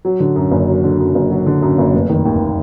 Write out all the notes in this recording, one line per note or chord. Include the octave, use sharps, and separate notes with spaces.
F#3
D3
F#2
F#1
F#3
D3
F#2
F#1
F#3
D3
F#2
F#1
F1
D#3
D#2